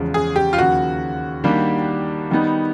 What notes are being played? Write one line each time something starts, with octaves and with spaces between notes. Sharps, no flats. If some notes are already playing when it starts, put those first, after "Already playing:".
Already playing: E2 C#3 F3 G#3
G#4
G4
F4
D#2 C#3 F3 F#4
D#3 G3 A#3 D4 G4
D#3 G3 B3 D#4